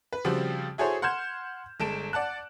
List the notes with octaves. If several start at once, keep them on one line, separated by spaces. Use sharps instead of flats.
B4
C#3 F3 G3 C4 F#4 G4
E4 F#4 G#4 A4 C5 C#5
F#5 C6 F6 G6 G#6 E7
G1 G#3 A5 D7 E7
D5 F#5 A5 F#6